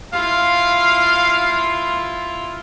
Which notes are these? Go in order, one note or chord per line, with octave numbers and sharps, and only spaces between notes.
E4 F4 F5